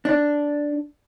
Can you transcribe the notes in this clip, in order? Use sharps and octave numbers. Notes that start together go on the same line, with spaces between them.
D4